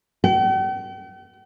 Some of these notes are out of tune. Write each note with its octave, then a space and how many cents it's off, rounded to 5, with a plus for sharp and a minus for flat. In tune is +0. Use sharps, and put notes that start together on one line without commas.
G5 -45